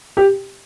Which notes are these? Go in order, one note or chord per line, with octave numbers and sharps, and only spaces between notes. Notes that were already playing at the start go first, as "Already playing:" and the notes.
G4